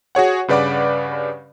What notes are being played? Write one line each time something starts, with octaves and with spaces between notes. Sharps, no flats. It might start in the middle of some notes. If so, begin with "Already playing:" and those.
F#4 G#4 C#5 F#5
G2 C#3 B4 D5 F#5 D6